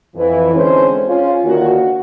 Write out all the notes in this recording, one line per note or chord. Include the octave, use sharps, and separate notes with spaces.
F2 E3
D3 G#3 C4 C#4 C5
C#4 F4
D2 D#3 A#3 F#4